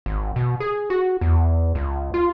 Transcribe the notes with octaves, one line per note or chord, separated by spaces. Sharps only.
G#1
B2
G#4
F#4
E2
C#2
F4